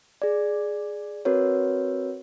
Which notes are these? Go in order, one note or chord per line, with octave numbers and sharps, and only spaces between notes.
G#4 D5
C4 F#4 A#4 B4 C#5